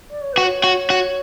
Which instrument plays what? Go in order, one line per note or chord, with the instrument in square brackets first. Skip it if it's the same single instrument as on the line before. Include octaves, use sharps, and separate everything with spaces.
[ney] D5
C#5
[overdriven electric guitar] F#4 [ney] B4
[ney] C#5
[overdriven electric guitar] F#4
F#4